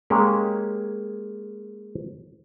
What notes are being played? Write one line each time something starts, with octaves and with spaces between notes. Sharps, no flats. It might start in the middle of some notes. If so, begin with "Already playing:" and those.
G#3 A#3 C#4 G4